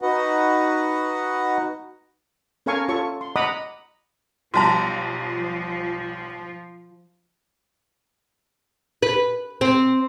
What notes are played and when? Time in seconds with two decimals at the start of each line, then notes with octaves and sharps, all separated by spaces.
0.02 D#4 F#4 B4 D#5 F#5
2.66 C#4 A4 A#4 F5 G#5 C#6
2.88 F4 A4 C#5 C#6
3.21 C6
3.36 D#5 F#5 A#5 B5 D6 D#6
4.54 B1 F3 G3 F#4 A5 A#5
9.03 B4
9.61 C4